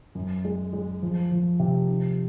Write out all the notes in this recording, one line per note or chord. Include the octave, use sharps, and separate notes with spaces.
F#2
G#3
G#3
F3
F3
C3
D#3